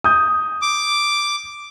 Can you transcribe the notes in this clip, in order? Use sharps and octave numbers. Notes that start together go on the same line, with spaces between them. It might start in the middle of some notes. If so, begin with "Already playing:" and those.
D#6 G6
D6